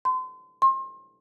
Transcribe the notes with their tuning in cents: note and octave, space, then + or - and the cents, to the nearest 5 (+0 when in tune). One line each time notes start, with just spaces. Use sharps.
C6 -35
C6 +35